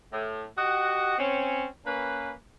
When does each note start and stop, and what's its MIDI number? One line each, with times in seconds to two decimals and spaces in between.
0.12 0.44 45
0.57 1.18 66
0.57 1.18 67
0.57 1.18 75
0.57 1.18 78
1.18 1.65 60
1.18 1.65 61
1.86 2.31 58
1.86 2.31 61
1.86 2.31 71